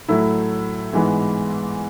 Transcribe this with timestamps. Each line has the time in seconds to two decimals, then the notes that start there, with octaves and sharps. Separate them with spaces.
0.08 A2 F#3 A3 E4
0.93 G#2 E3 G#3 B3